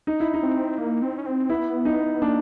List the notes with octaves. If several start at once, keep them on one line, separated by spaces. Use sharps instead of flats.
D#4
E4
D#4
C4
A#3
C4
C#4
C4
B3 E4
D#4
A#3 D4